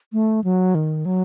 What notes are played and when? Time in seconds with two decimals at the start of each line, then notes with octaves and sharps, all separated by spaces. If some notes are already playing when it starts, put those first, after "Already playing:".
0.13 A3
0.44 F#3
0.75 D#3
1.05 F#3